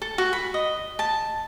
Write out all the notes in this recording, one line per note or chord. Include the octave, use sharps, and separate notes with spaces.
A4
F#4
B5
D#5
A5